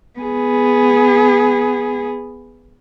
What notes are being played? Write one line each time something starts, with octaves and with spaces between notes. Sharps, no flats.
B3 G#4